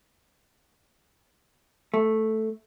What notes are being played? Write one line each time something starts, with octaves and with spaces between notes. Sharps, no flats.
A3